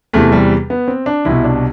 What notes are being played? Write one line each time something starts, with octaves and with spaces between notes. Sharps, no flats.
E2 C3 E3 A3
G3
B3
C4
D4
C2 B2 E4
D4